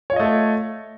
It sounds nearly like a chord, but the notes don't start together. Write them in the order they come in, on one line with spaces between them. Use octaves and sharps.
C#5 F4 D#5 A3 A4